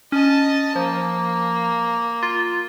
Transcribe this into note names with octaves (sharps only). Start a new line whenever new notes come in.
C#4 D#5 A5
F3 A#3
F4